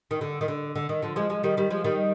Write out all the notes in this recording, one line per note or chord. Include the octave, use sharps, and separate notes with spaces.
D#3
D3
D#3
D3
D3
D#3
D3 F3
F3 G#3
F3 G#3
D#3 G3
D#3 G3
F3 G#3
D#3 G3